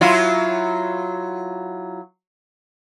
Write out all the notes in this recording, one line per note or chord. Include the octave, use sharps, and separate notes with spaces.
F#3 E4 F4